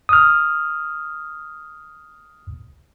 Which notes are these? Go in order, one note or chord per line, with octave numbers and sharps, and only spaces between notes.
D#6 F6